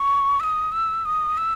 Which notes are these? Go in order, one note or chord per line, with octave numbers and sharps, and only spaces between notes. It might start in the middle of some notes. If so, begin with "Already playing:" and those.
Already playing: C#6
E6
D#6
E6
D#6
E6